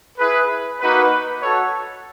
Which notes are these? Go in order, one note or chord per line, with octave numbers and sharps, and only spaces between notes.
E4 G#4 B4
A#3 D#4 F#4 B4
F#4 A4 C#5